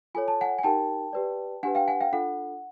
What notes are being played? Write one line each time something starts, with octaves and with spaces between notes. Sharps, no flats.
F4 A4 C#5 G#5
A5
F#5 G#5
G#5
D#4 G4 A#4 G5 A5
G4 B4 D5
D4 G4 B4 F#5 G#5
F5 G5
F#5 G#5
F5 G5
D4 F4 A4 F#5